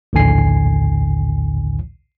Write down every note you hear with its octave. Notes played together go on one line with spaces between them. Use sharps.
A#1 D#2 A2 D3 G#5 C7